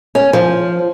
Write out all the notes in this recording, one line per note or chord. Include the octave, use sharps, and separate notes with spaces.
C#4
F3